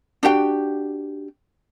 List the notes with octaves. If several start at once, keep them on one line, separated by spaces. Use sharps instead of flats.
D4 F#4 G4 G5